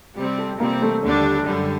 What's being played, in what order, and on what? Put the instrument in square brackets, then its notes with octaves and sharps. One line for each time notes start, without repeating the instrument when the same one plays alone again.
[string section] C3 G3 C4
[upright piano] A4
[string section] C3 G3 C4 [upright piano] A#3
[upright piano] A3
[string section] D#2 D3 G3 D4 [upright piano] A3
[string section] F#2 D3 G3